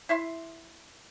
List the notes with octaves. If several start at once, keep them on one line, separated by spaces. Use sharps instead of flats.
E4 E5 C6